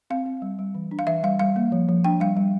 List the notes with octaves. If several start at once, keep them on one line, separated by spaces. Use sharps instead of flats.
C4 F5
C4
G3
G3
E3
D4
F5
E3 E5
G3 F5
G3 F5
A#3
F3
F3
D4 G5
G3 F5
G3